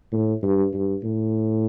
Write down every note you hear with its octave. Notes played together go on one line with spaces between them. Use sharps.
A2
G2
G2
A2